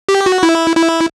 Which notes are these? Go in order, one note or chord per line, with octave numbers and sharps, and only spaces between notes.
G4
F#4
E4
E4